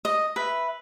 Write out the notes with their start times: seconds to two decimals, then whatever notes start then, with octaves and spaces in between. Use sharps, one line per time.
0.05 D#5
0.36 B4 E5